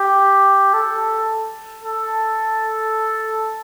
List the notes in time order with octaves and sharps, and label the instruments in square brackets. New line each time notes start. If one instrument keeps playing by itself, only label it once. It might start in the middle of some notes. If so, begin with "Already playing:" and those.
Already playing: [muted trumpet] G4
A4
A4